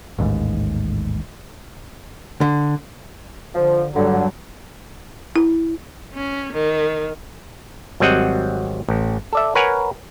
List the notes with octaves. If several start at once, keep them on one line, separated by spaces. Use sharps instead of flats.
A1 D#2 G#2
D3
D3 F3
G2 D3 F#3
E4
C#4
D#3
G#1 F#3 G3 C4 D#5 F#5
A1
A4 D5 E5
A#4 B4 C#5 F#5 G#5